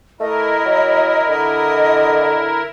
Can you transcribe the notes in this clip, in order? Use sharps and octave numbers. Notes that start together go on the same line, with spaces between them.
A3 E4 A#4 D#5
F#3
D3 D#5